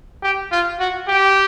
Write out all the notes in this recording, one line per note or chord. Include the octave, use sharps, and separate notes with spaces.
G4
F4
F#4
G4